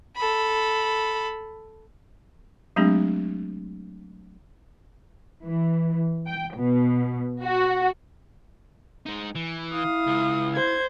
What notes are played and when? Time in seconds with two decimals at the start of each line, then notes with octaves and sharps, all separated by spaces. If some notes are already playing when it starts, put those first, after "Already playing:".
0.17 A4 B5
2.76 F#3 G#3 A3 C4 D4 G4
5.45 E3
6.27 G5
6.56 B2
7.44 F#4
9.06 G#3 D#4
9.35 E3
9.73 E4 F5 D#6
10.07 C#2
10.56 C5 G#6